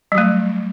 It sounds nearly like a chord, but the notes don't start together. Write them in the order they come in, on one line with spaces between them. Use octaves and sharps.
G3 F#3 A3